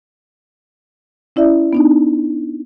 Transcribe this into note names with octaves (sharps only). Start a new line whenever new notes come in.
C#4 E4 D5 E5
B3 D4 D#4